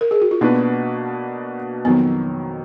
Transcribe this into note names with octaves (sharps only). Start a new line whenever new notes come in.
A#4
G#4
F#4
F4
B2 A#3 B3 D4 D#4 F#4 B4
F2 D#3 F#3 B3